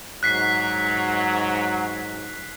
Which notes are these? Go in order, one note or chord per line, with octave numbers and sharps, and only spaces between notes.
G#2 F#3 F#6 B6 C7